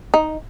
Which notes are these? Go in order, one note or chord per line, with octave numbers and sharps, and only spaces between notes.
D#4